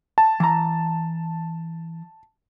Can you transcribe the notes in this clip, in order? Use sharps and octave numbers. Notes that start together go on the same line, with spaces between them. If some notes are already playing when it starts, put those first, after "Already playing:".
A5
E3 A#5